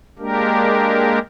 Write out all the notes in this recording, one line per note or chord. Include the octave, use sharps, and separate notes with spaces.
G#3 A#3 D4 G4 A#4